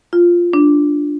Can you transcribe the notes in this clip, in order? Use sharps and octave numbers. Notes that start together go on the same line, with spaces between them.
F4
D4